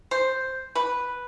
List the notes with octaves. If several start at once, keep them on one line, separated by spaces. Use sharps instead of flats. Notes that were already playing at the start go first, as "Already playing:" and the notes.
C5
B4